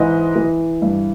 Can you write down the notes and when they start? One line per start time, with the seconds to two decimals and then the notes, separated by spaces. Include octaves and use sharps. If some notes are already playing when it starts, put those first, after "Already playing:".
Already playing: G#2 E3 D#5
0.36 E3
0.82 G2